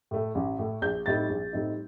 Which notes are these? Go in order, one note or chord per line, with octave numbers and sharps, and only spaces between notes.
A2 A3
A1
A2 A3
A#1 G6
A2 G3 C4 D#4 A6
A#1
A2 G3 C4 D#4